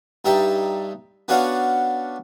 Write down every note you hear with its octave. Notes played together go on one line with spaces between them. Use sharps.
G2 G3 D#4 E5 G5
B3 C#4 D4 F#4 D5 F5